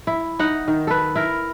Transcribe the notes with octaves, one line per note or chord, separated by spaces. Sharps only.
E4
D#4 F#5
D#3
A4 B4
E4 A#4